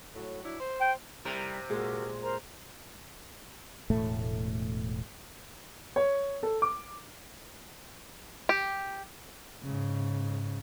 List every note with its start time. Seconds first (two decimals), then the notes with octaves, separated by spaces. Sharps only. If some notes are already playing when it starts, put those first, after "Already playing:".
0.15 A2 F#3 F#4
0.43 F#3 D4 E4
0.60 C5
0.81 G5
1.25 C3 G3 E4 A#4
1.70 A#2 G#3 F#4 A#4
2.21 A#4 C5 A#5
3.90 E1 A2 A3
5.96 C#5
6.43 A4
6.62 D6
8.49 G4
9.63 G#2 C#3